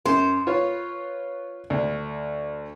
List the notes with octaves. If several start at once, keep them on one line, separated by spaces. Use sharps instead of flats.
F#2 C5
F4 B4 C#5
D2